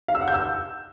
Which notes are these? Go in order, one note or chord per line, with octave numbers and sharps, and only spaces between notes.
F5
E6
F#5
G6
E6